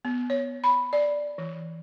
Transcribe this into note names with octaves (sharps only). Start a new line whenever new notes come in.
B3
C#5
B5
D5
E3